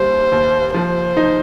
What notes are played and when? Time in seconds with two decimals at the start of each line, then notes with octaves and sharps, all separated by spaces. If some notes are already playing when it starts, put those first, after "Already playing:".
Already playing: D#2 G3 C5
0.32 D#2
0.74 F3 C5
1.17 D#4